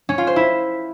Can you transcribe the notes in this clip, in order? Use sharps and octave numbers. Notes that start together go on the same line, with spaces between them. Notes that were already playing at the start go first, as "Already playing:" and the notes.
C#4
F4
C5
E4